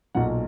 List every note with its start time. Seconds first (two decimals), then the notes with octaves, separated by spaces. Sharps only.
0.15 B1 A#2 F#3 F#5